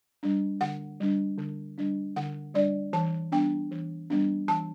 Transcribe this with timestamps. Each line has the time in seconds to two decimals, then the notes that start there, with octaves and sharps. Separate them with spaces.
0.23 G3 D4
0.61 D3 F#5
1.00 G3 D4
1.38 D3
1.78 G3 D4
2.16 D3 F#5
2.54 G3 D4 D5
2.93 E3 A5
3.32 G3 B3 D4 G5
3.71 E3
4.10 G3 B3 D4
4.48 E3 A5